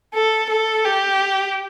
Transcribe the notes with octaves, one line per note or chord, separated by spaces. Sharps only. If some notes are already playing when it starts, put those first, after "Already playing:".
A4
A4
G4